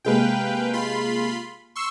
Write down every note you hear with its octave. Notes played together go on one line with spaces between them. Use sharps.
C3 G#3 A#3 B4 F5 G5
F4 B5 C6
C6 C#6 E6